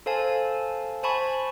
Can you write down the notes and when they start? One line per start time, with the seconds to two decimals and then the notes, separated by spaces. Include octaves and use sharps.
0.06 A4 C5 F5 G#5 A5
1.03 C5 G#5 A5 B5 C#6